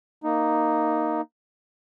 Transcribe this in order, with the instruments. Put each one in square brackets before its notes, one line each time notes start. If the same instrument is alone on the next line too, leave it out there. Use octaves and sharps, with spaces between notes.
[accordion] A#3 D#4